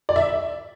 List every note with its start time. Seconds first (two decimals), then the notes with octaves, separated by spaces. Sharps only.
0.09 D5
0.16 E5